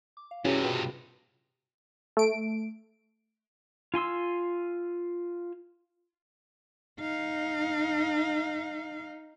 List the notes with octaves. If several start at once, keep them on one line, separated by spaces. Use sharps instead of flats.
D6
F5
G2 C3 C#4 E4 F#4 G#4
B2 F4 B4 G5
A3 D7
F4 G#5 C6 E6
D#4 F5